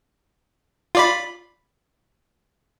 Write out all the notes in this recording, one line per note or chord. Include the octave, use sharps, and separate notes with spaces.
F4 D5 B5